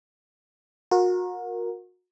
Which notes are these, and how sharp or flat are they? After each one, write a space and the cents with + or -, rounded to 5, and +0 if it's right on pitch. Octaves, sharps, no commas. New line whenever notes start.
F#4 -35 A#4 +0